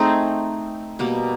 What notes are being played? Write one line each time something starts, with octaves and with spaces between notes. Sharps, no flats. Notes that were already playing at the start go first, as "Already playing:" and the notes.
Already playing: A3 C4 D#4 G#4
B2 G3 A#3